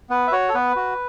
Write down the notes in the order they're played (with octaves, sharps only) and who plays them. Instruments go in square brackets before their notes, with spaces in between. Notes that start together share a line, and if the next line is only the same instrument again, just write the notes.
[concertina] B3 B4
E5
F#4 C#5
A4
B3 B4
F#4